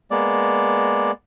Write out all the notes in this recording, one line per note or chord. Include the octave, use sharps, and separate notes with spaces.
G#3 A#3 B3 D5